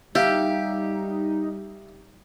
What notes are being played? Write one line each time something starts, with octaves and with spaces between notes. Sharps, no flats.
G3 D#4 G4 E5 F5